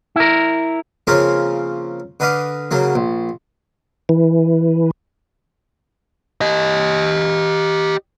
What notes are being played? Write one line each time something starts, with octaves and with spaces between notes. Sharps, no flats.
E4 A#4
C#3 F3 A#3 C4 C#4 A#4
D3 B4 D#5 F5 D6
C#3 F#3 A#3
A#1
E3
G4 D#5